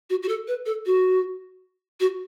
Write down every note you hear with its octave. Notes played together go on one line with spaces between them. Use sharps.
F#4
F#4
A4
B4
A4
F#4
F#4